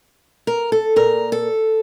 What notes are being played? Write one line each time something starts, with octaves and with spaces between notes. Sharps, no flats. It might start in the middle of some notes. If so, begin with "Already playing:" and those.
A#4
A4
A#2 A#4
A4